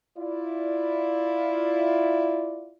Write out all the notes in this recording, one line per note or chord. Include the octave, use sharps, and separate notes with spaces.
E4 F4 D5